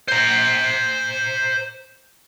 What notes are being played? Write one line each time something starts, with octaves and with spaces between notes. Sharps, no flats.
C5 A#5